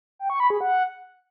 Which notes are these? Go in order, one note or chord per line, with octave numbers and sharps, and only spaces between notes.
G5
C#6
B5
G#4
F#5